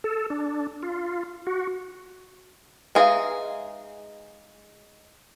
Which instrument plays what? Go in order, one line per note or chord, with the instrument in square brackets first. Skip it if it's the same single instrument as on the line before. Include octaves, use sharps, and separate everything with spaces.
[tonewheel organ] A4
D4
F4
F#4
[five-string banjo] G#3 D#4 G#4 [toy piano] B4 E5 F5